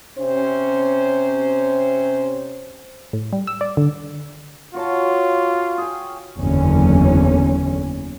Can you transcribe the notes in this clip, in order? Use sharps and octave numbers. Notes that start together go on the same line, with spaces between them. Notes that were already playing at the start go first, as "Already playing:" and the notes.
C3 C#4 C5
A2
G3
E6
D5
D3
F4 F#4 C#5 A5
G#4 G5
F#1 E2 D3 C#4